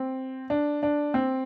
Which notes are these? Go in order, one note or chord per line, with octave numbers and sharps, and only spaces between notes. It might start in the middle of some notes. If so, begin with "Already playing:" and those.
Already playing: C4
D4
D4
C4